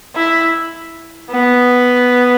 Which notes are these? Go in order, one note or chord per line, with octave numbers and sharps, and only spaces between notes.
E4
B3